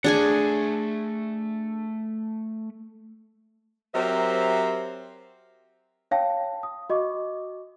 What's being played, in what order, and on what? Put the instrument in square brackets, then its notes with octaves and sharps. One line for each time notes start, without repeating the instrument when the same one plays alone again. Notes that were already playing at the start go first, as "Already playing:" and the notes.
[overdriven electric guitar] A3 F#5 [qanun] D4 G#4 G#5
[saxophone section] F#3 C4 G4 A#4 C5 E5
[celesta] C#5 F5 G5 A5
D#6
F#4 D#5 C#6 D6